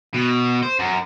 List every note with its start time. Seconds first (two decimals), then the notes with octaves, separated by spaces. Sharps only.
0.14 B2
0.63 C5
0.79 F#2